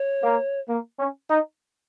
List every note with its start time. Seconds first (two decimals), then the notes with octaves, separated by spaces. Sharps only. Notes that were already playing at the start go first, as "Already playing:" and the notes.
Already playing: C#5
0.24 A#3
0.69 A#3
1.00 C#4
1.30 D#4